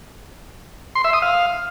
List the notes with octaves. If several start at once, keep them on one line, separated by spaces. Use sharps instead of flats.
C6
E5
D#6
F5